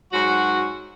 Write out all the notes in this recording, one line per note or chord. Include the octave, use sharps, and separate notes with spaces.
G#2 F#3 F#4